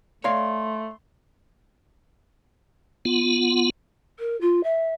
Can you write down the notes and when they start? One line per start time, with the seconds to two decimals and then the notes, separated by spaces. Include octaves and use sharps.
0.24 A3 C#5 D5 F5 C6
3.05 B3 F4
4.19 A#4
4.40 F4
4.63 E5